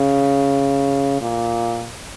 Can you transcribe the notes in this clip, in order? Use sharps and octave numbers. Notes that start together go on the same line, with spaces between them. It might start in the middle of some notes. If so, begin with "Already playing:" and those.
Already playing: C#3
A#2